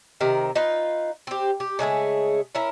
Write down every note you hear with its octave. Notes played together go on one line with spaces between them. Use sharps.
C3 D#3 A#4
D#4 F4 B4
C4 G4
G4
C#3 G#3 A3 G#4
C#4 E4 A#4